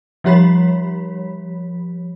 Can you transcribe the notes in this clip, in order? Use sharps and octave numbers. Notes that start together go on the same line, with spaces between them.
F3 G3 G4 C#5 B5 B6